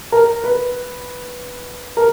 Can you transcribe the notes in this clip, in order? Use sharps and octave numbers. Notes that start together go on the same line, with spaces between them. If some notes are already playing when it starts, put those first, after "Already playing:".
A#4
B4
A#4